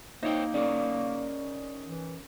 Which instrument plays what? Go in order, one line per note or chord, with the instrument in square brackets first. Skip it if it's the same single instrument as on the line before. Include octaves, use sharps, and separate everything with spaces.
[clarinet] A#3 [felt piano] D#4 [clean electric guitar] C5 C#5 G5
[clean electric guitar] C#4 G#4 A#4 [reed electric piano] D5
[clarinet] E3